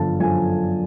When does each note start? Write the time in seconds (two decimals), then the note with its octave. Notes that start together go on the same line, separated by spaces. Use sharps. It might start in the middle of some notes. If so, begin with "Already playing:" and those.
Already playing: G1 F#2 D3 F3 A5
0.20 G1 F#2 D3 F3 G#5